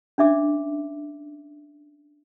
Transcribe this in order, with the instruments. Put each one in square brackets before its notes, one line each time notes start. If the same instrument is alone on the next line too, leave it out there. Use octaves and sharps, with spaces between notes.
[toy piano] C#4 D4 E5 D6